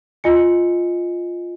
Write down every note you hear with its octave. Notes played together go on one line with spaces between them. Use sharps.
F4 D#5 G#5 C#7